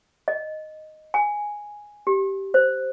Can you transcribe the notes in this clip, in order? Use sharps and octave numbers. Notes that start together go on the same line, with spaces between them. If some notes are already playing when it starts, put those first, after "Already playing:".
D#5
G#5
G4
C5